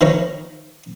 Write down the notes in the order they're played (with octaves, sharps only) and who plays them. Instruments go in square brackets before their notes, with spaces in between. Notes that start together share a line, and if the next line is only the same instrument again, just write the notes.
[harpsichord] D#3 F3 D#4 E4 A#4 C#5